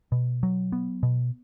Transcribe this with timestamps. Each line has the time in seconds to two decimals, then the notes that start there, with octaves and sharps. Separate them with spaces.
0.12 B2
0.43 F#3
0.72 B3
1.03 B2